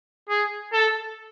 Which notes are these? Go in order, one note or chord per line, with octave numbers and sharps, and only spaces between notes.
G#4
A4